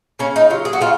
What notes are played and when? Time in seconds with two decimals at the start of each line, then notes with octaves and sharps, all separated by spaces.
0.19 C#3 C#4
0.36 D#4
0.50 F#3 F4
0.65 G#4
0.73 F#4
0.81 C#3 F4